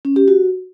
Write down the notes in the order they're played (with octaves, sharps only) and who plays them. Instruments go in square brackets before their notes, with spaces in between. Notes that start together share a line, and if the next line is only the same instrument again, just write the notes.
[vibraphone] C#4
G4
F#4